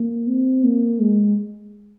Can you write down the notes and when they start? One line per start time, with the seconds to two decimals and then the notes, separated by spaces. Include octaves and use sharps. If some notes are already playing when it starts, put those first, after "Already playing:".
Already playing: A#3
0.27 C4
0.64 A#3
1.01 G#3